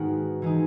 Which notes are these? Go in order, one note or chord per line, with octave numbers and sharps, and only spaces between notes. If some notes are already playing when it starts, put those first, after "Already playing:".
Already playing: G#2 D#3 G#3 B3 F#4 A#4
E3 G#3 D#4